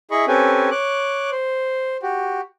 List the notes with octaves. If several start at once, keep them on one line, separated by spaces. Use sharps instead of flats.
E4 G#4 D#5 B5 C#6
C4 C#4 G4 A4 B4 G#5
C#5 D6 F#6
C5
F#4 G4